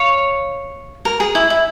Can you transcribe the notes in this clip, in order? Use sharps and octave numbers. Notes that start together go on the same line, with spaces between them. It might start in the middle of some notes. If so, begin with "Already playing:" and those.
Already playing: C#5 F5
A#4
G#4
E4
E4